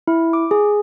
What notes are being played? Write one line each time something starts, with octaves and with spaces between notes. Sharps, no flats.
E4
D6
G#4